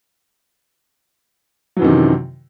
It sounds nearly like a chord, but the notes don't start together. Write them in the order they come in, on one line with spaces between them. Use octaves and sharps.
F#3 E3 F#2 D#3 C3